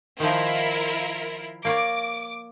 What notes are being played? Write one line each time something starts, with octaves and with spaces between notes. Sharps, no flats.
D#3 F3 E4 F4 A#4
A#3 C#5 D5 D6